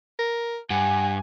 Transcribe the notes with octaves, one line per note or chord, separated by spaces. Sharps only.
A#4
G2 F#5 G#5